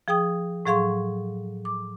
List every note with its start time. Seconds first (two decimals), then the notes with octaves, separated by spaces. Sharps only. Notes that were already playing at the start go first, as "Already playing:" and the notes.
0.08 F3 G#4 G5 D#6
0.66 A2 F#3 G#4 F5 C6 C#6
1.65 D6